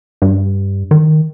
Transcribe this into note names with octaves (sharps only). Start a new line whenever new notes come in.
G2
D#3